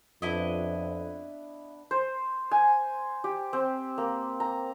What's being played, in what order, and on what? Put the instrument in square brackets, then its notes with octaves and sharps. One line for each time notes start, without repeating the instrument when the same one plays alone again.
[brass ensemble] F2 [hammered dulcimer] B3 D4 B4 [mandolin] E4 D#5
[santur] C5
G#5
G4
C4
A#3
A#5